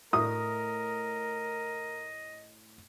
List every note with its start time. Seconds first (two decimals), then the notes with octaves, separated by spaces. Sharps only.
0.13 A2 A#4 D#5 D#6